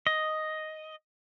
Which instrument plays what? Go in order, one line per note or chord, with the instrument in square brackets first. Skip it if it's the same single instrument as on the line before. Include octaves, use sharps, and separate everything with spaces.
[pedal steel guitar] D#5